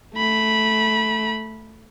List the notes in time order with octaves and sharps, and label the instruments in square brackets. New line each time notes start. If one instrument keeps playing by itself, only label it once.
[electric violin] A3 B5